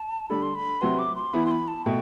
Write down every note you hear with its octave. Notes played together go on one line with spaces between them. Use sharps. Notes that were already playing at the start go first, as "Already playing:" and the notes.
Already playing: A5
D3 G3 D4 A4 B5
C6
B5
C3 F#3 C4 F#4 B4 C6
D6
C6
E3 B3 E4 B5
C6
B5
A5
B2 A3 G5